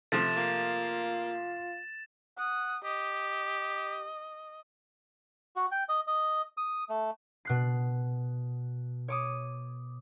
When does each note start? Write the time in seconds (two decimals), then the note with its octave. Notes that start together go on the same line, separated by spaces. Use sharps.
0.12 C3 F3 A3 A6 E7
0.36 A#3 F4
2.38 F#5 D#6
2.84 G4 D#5
5.56 F#4
5.71 G5
5.89 D#5
6.07 D#5
6.57 D#6
6.89 A3
7.45 B2 F#6 C7
9.08 C#5 D6 D#6